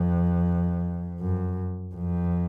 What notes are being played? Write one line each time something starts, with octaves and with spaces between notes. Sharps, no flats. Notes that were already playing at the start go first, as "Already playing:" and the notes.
Already playing: F2
F#2
F2